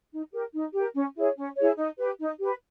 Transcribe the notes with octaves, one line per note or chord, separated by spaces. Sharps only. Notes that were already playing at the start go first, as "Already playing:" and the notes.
D#4
G4 A#4
D#4
G4 A#4
C#4
E4 G#4 C#5
C#4
E4 G#4 C#5
D#4
G4 B4
D#4
G4 B4